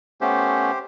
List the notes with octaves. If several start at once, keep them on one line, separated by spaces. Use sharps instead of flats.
A3 B3 C#4 G4 C5